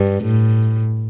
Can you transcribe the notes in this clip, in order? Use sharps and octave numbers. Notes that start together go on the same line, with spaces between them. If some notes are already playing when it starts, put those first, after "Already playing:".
Already playing: G2
A2